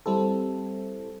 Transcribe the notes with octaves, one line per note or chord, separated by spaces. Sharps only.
G3 C4 E4 A4